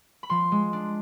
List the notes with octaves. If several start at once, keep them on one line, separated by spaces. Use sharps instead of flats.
B5
F3 C6
G#3
D4